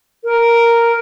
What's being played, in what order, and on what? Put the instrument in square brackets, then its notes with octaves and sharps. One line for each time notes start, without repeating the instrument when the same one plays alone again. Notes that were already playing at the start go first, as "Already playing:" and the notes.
[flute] A#4